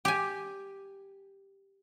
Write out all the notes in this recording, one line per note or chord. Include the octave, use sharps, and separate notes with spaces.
G4 G#5